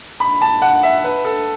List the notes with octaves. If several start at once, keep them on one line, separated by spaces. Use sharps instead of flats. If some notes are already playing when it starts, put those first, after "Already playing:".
B5
A5
F#5
E5
B4
A4